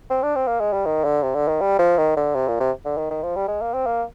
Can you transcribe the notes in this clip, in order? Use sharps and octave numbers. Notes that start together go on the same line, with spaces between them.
C4
D4
C4
A#3
G#3
G3
D#3
D3
C3
D3
D#3
G3
F3
D#3
D3
C3
A#2
C3
D3
D#3
D#3
F3
G3
G#3
A#3
C4
A#3